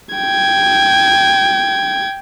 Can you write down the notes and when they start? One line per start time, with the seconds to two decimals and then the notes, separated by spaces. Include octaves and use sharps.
0.15 G5 G#6